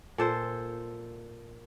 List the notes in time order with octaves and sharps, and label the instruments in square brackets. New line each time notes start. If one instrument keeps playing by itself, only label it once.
[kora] A#2 A4 C5